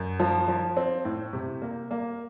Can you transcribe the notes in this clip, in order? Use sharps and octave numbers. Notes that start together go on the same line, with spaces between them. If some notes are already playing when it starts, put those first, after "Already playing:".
Already playing: F#2
F3
F3
C4
A2
C3
A#3
A#3